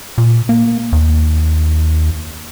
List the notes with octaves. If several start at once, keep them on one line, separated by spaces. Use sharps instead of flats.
A#2
A#3
D#2